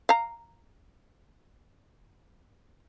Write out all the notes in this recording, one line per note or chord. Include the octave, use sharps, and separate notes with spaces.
F5 A#5